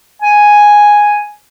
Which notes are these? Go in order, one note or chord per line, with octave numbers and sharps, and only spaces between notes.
G#5